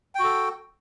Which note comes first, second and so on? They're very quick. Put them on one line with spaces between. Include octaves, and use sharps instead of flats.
G5 F#4 A4